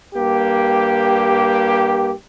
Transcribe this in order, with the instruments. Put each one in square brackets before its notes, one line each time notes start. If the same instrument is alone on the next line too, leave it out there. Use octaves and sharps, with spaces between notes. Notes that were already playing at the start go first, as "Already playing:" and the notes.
[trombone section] G2 A#3 G4